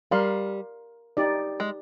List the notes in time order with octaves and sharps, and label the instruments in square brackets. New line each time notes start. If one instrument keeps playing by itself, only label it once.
[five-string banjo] G3 [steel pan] A#4 F5 C6
[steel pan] D#4 G4 D5
[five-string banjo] G#3